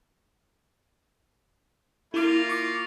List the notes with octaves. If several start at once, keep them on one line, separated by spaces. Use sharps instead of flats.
A#3 E4 F4 D6
C#6 D6